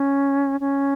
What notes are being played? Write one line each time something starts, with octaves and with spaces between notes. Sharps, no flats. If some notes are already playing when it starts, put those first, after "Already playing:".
Already playing: C#4
C#4